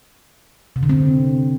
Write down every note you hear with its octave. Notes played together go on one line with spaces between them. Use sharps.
C3
D3
C4